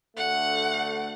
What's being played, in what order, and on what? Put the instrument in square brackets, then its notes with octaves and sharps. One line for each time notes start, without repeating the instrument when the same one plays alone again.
[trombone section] D2 D3 A3 [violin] F#5